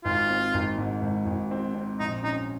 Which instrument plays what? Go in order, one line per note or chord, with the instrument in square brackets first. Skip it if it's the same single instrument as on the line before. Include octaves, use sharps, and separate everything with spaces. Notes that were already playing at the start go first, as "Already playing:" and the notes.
[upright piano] G#1 [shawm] F4
[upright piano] C4
G#1
G#2
G#1
G#1
C4
C4
[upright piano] A#1 [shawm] D#4
[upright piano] C#4 [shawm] D#4